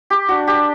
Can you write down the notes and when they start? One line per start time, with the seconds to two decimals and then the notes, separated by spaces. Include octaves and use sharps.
0.10 G4
0.29 D4 F#4
0.47 G4